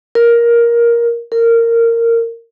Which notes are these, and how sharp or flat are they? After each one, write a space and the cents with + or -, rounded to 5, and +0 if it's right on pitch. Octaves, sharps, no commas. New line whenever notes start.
A#4 +10
A#4 -15